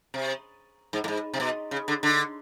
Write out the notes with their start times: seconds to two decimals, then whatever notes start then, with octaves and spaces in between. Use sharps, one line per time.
0.14 C3
0.93 G#2
1.04 A2
1.08 G#2
1.34 C3
1.40 B2
1.71 C#3
1.88 D3
2.03 D3